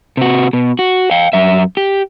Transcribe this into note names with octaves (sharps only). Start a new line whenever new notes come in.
C3 F#4
B2
F#4
F5 G5
F#2 E5
G4